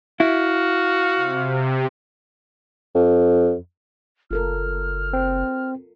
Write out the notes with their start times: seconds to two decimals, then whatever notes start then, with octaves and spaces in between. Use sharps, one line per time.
0.20 E4 F#4 F5
1.16 C3
2.95 F2
4.31 F#1 F4 A4 A#4 F6
5.13 C4